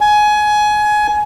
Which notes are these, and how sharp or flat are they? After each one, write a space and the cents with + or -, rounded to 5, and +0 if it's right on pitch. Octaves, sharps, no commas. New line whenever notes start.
G#5 +20